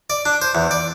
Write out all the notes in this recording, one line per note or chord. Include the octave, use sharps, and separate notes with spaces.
D5
D4
C5
E2
D5